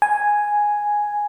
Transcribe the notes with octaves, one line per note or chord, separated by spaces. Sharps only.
G#5